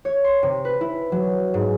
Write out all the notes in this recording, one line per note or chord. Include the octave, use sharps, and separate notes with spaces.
C#5
C6
C3
B4
E4
F#3
G#2